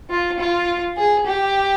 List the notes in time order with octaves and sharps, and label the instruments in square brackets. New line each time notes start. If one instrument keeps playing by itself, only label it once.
[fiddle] F4
F4
G#4
G4